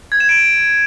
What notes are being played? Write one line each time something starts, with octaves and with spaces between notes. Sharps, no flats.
G#6
E7
D7